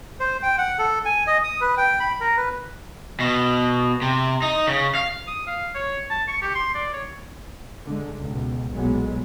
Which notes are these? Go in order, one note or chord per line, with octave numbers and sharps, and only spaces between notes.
C5
G5
F#5
A4
G#5
D#5
D#6
B4
G5
B5
A#4
B4
B2
C3
D#4
C#3
F5
D#6
F5
C#5
A5
C#6
G4
C6
D5
C#5
D3 G#3
C#2 B2
B1 A#2 F#3 G#3 B3